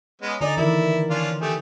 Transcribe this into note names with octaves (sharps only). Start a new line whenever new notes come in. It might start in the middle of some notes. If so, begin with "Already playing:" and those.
G#3 B3 C#4
D3 D#4 G#4 D5
D#3 E3 E4 A#4
C#4 D4 F4
A3 G4 G#4